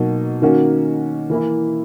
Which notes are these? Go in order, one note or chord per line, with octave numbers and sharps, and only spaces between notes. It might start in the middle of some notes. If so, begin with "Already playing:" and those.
Already playing: B2 F#3 A#3 D#4
D#3 A#3 C#4 F#4
E3 A#3 E4